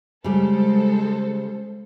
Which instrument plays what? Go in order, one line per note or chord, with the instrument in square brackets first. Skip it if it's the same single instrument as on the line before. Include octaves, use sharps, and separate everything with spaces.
[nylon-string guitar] C#3 G3 [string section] G#3 A4 C5